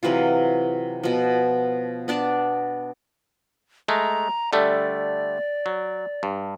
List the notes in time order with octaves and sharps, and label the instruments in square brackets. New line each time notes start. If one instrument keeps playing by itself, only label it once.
[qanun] C3 E3 F#3 F4
B2 F3
B3 D4 D5 A5
[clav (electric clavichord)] G#3 A3 [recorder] A#5
[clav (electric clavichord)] D3 G3 A3 [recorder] D5
[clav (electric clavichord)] F#3
G2